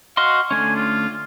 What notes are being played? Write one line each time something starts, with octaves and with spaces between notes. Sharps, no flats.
F#4 D#5 F5 C6
D3 A3 C#4 G#5
F4